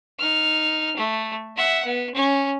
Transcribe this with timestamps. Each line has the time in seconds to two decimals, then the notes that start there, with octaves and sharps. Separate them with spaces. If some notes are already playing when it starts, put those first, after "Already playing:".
0.19 D#4 F6
0.96 A3
1.56 E5 F#5
1.85 B3
2.15 C#4